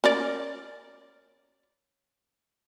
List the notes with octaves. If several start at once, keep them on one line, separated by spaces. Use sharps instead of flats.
C#4 A#4 D5